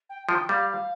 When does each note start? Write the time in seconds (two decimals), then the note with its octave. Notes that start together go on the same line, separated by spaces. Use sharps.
0.09 G5
0.29 F3 G5
0.49 G3 F5
0.69 F5